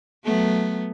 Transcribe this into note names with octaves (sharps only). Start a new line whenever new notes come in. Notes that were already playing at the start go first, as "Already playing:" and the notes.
F#3 A3 B3